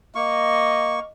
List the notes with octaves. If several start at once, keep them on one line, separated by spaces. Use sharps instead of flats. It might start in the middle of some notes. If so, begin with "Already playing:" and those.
A#3 D#5 C#6